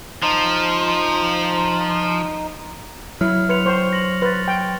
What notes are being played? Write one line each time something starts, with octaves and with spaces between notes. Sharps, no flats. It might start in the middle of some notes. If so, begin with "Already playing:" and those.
F3 D#4
F#3 E4 F6
B4 C6 C#7 F7
C5 C#6
A#6 F#7
B4 C6 A6
G5